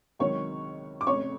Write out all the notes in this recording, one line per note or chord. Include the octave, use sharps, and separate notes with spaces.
C#2 C3 D#3 F#3 C#5 C#6
D6
F1 F2 C#3 C#5 C#6